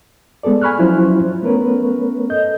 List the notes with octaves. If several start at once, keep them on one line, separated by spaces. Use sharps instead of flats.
G#3 B3 G#4 A4 D5
G#5 B5 C#6 F6 F#6
F3 F#3 C#4 E4 F4 C5
A3 B3 C#4 A#4 B4 C#5
A4 D#5 G6